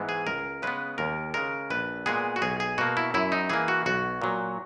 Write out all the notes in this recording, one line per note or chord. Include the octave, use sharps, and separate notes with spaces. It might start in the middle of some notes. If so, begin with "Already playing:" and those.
Already playing: G#2 E3 G#3 B3
G#4
C#2 A#4
C#3 G#3 B3 B4
D#2 A#4
C#3 G#3 A#4
A#1 B4
A#2 G#3 B3 G#4
F#4
B1 G#4
G#4
B2 A#3 F#4
E4
F#2 E4
D#4
E3 A#3 G#4
F#4
B1 F#4
A#2 F#3